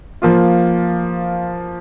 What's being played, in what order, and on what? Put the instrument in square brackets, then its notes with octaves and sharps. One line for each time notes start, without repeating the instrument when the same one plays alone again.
[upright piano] F3 A#3 F4